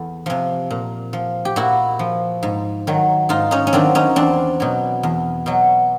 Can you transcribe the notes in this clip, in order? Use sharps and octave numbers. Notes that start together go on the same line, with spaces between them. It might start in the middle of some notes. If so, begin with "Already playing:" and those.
Already playing: E2 A4
C3 F3
A#2
F3
G4
A#2 E4 F#4
F3
G#2
D#3 F#3
G#2 D#4 F4
C#4 D#4
C#4
D#3 F#3 C4 D4
C#4 D#4
E2 C4 D4
B2 F#3
E2
B2 F#3